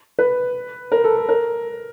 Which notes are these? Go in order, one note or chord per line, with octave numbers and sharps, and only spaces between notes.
B4
A#4
A4
A4
A#4